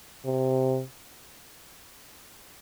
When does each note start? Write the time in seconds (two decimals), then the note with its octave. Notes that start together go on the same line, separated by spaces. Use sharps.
0.25 C3